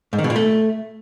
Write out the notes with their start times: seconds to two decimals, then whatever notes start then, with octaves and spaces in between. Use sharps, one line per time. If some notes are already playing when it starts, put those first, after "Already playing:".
0.13 G#2
0.19 D#3
0.24 B2
0.30 A#2
0.36 A3